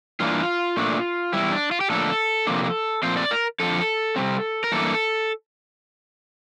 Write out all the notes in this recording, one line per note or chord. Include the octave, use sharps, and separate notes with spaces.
G2 E3 A#3 D4 F4
A#2 A3 D4
E2 C3 G3 E4
D4
F4
G4
A2 F3 A#3 D4 A4
C3 F3 A#3 D4
A#2 F3 A3 C4 C5
D5
A#4
F2 D3 F3 A4
C3 G3 C4
A#4
G2 E3 A#3 D4 A4